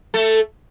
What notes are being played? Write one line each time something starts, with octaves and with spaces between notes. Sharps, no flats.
A3 A4